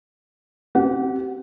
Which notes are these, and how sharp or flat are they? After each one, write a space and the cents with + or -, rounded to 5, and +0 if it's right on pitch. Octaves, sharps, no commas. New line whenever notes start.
C4 +0 G4 -30 F#5 +0